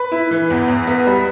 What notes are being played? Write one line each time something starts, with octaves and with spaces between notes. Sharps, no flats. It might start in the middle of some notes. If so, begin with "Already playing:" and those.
Already playing: B4
E4
E3
E2
E2
B3
G3